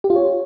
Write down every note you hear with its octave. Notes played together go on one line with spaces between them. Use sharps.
G4
F4
C#5